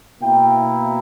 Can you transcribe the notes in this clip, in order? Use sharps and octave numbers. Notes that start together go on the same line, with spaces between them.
B2 A#3 E4 G5